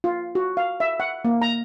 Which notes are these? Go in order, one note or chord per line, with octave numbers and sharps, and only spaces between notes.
F4
F#4
F5
E5
F#5
A#3
A#5